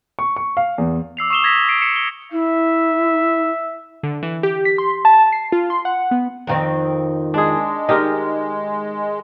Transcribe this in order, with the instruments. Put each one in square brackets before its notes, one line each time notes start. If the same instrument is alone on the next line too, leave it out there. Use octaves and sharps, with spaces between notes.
[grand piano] C#6
C#6
F5
E2
[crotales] D6 E6 C7 F7
C#6 D#6 C7 E7 F7 G7
D6 D#6 G#6 A#6 B6
C7 D7
C7 C#7 E7
G7
[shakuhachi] E4 [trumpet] E5
[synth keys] D3
E3
G4
B6
C6
A5
C7
F4
C6
F#5
B3
[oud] F2 D#3 C4
[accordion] G#3 [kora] D4 G#4
[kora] D#3 G4 A#4 [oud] D#4